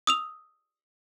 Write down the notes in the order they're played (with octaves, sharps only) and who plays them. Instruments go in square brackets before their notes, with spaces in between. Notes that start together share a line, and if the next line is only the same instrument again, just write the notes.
[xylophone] D#6 E6 F7